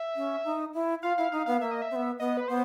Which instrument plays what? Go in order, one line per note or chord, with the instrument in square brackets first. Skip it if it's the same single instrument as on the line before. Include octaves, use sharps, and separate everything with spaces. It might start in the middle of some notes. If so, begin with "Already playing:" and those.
Already playing: [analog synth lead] E5
[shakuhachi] C#4
D#4
E4
[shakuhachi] F4 [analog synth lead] F5
[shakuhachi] E4 [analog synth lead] F5
[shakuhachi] D#4 [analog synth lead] F5
[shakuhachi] B3 [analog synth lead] F5
[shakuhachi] A#3 [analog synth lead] E5
[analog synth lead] D#5
E5
[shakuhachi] C4
B3
[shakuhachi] B3 [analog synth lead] D#5
[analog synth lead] B4
[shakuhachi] B3 [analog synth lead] C5